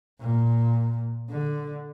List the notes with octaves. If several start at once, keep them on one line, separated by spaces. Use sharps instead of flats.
A#2
D3